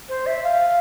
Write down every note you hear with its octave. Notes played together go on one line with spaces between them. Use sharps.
C5
E5
F5